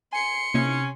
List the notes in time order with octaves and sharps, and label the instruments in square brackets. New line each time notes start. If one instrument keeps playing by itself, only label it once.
[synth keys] G#5 C7 [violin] C6 C#7
[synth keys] C3 [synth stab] A#3 D#4 E4 [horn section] C#4